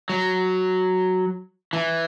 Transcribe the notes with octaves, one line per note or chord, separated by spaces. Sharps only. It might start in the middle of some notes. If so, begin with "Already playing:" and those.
F#3
E3